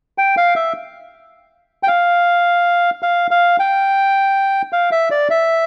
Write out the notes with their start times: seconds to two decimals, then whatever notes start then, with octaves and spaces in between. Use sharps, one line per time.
0.18 G5
0.37 F5
0.56 E5
1.83 G5
1.88 F5
3.03 F5
3.31 F5
3.59 G5
4.73 F5
4.92 E5
5.11 D5
5.30 E5